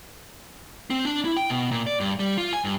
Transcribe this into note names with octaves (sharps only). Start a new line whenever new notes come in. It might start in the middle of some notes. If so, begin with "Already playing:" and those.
C4
D4
E4
G5
B2
A#2
D5
G2
G3
F4
G#5
G2